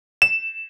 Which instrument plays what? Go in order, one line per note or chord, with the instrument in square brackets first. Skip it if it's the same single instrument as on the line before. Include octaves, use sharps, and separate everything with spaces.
[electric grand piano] E7